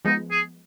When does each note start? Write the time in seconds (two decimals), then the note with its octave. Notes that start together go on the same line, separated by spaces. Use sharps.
0.05 F3 G#3 B3 D#4
0.31 G#4